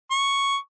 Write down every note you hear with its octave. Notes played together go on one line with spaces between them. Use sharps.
C#6